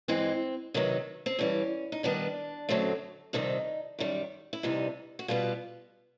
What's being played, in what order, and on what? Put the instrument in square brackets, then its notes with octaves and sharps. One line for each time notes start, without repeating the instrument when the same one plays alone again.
[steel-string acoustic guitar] G2 E3 G#3 C4
C3 D#3 F#3 B3
C4
G2 E3 G3 C#4
D#4
G2 D#3 G3 B3 D4
F#2 D3 F#3 A3 C4
F2 C3 D#3 G3 D#4
F#2 D#3 G3
E4
D2 C3 E3 G3 D#4
F#4
B2 G3 B3 F4